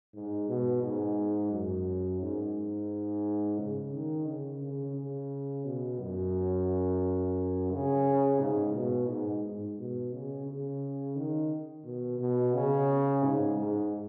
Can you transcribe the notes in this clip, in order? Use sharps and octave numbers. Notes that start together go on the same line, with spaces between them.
G#2
B2
G#2
F#2
G#2
C#3
D#3
C#3
C#3
C#3
B2
F#2
C#3
G#2
B2
G#2
G#2
B2
C#3
C#3
D#3
B2
B2
C#3
G#2
G#2